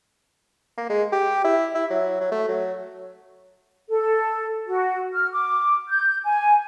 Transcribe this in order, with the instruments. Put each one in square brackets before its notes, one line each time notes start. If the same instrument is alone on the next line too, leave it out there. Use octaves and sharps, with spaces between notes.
[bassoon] A#3
G#3
G4
E4
E4
F#3
F#3
A3
F#3
[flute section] A4
F#4
F6
D6
G6
G#5